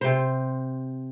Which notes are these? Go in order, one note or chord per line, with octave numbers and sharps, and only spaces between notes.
C3 C5